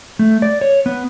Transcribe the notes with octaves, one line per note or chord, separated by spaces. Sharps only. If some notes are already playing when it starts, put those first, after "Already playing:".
A3
D5
C#5
B3